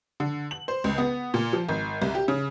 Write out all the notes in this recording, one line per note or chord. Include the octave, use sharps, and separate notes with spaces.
D3
F#7
C5
C#2
B3
A#2
F3
G#1
C2
G4
C#3